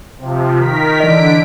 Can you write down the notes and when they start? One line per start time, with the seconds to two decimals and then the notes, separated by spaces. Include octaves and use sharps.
0.18 C3 F3
0.58 D#3 A#4 B6
1.00 D3 E3 D#5 B6 D7